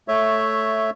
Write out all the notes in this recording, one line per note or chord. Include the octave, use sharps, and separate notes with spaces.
A3 C#5 E5